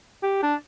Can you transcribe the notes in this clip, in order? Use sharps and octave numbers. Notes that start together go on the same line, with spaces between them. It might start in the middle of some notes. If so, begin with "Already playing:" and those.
G4
D4